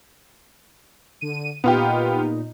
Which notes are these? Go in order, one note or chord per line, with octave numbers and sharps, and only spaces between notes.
D3 D#7
A#2 B3 D#4 F4 G4